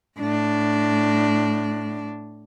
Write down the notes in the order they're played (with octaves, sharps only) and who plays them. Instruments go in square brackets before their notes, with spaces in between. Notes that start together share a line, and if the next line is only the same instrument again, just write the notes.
[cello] A2 D4